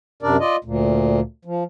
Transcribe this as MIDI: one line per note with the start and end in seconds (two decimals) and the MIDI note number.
0.22 0.37 42
0.22 0.37 48
0.22 0.37 62
0.22 0.37 70
0.22 0.37 74
0.40 0.56 65
0.40 0.56 74
0.40 0.56 75
0.64 1.20 38
0.64 1.20 46
1.45 1.64 53